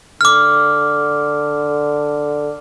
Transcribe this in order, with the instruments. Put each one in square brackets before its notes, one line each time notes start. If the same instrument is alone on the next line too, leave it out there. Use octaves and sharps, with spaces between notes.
[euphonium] D3 [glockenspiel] D6 F6